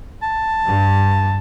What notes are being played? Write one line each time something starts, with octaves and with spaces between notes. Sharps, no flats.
A5
G2